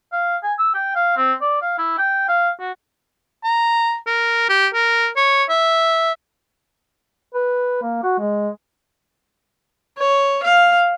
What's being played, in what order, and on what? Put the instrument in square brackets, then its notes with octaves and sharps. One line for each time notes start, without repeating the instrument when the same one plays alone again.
[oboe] F5
G#5
E6
G5
F5
C4
D5
F5
E4
G5
F5
F#4
[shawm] A#5
A#4
G4
A#4
C#5
E5
[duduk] B4
A#3
F#4
G#3
[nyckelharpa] C#5
F5